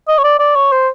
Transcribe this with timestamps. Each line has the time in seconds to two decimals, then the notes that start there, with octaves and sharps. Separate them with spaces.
0.08 D#5
0.19 C#5
0.24 D5
0.39 D5
0.56 C#5
0.72 C5